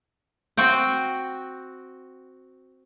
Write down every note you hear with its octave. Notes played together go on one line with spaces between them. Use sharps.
C4 F#4 F#5 G5